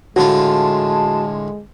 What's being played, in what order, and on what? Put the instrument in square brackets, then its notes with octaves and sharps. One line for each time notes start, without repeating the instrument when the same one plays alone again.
[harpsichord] A2 D3 F4 [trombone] G#3 [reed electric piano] F#4 [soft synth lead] A5